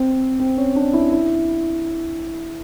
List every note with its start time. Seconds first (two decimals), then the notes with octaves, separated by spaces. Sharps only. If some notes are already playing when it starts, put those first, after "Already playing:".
Already playing: C4
0.40 C4
0.57 C#4
0.76 D4
0.93 E4
1.12 E4